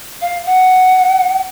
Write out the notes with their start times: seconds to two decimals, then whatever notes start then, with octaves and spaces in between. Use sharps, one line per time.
0.21 F5
0.46 F#5